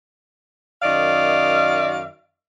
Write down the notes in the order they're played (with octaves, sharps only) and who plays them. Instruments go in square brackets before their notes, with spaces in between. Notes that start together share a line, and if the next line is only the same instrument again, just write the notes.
[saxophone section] F#2 D#3 D5 D#5 F5